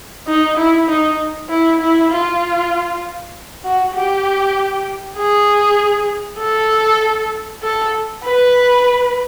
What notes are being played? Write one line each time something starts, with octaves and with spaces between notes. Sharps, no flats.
D#4
E4
D#4
E4
E4
F4
F#4
G4
G#4
A4
A4
B4